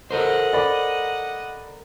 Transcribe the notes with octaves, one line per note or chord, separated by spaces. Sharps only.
A4 A#4 C5 D#5 F#5
D5 B5